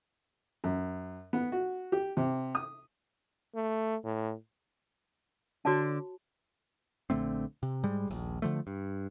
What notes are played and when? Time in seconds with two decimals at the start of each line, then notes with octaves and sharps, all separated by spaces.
0.64 F#2
1.33 B3
1.52 F#4
1.92 G4
2.17 C3
2.55 D#6
3.55 A3
4.04 A2
5.65 D3 D4 F#4 C#5 A5
7.10 A#1 D3 A3 C4
7.63 C3
7.83 G#2 G3 G#3
8.08 D#1 A#1
8.42 D3 F3 A3
8.67 G2